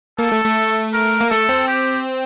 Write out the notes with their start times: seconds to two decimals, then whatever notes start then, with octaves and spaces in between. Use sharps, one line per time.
0.19 A#3 A4
0.32 A3
0.44 A3
0.93 A#4
1.21 A#3
1.30 A3 A4
1.49 C4
1.67 G4